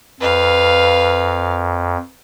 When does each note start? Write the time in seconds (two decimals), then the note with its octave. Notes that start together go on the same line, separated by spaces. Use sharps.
0.20 F2 B4 F5